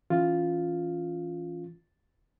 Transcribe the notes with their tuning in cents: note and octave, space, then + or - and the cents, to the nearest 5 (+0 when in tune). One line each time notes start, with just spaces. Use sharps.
E3 +0 C#4 +0 F4 +0